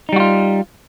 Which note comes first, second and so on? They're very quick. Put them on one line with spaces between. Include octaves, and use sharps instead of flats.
D#4 G3 F#4 F4